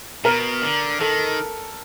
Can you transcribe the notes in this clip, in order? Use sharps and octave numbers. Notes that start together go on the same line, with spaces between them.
B2 A#4
D3
D#3 A4